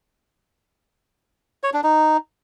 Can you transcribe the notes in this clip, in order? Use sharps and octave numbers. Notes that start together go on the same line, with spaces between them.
C#5
D4
D#4